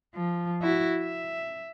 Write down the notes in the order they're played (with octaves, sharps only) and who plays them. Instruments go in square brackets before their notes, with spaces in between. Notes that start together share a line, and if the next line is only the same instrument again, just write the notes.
[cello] F3
E4 F#4
E5